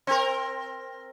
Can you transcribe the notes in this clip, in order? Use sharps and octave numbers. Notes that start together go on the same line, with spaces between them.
C4 A#4